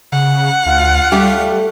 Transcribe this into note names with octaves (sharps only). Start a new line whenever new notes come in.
C#3 F#5
D2 F4 F5
G3 A3 G4